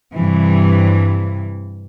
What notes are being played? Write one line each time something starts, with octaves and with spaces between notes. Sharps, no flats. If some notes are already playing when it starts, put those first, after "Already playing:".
G2 C3 E3